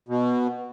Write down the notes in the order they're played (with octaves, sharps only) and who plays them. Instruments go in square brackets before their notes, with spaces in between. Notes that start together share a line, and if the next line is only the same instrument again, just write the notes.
[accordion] B2